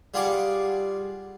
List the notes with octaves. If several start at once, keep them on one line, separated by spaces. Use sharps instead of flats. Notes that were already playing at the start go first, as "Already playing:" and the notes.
G3 F4 G#4 F#5 D6